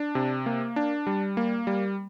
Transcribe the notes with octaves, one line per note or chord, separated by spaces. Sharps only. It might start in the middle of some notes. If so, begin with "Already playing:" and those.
Already playing: D4
C3
A#3
D4
G3
A#3
G3